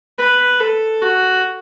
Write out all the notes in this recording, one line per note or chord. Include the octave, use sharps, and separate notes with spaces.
B4
A4
F#4